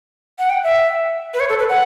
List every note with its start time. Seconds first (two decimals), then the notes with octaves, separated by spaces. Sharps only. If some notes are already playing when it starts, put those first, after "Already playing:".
0.39 F#5
0.50 G5
0.64 E5
1.34 B4
1.40 C#5
1.49 A4
1.59 B4
1.69 F#5